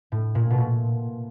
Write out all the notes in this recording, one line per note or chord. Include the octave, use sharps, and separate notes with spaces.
A2
A#2
B2
A#2